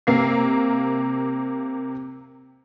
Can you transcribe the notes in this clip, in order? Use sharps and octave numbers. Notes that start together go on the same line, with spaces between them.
C3 A#3 F5 C7